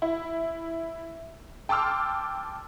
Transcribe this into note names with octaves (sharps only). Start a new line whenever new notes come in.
E4
G5 A5 C6 D6 E6 F6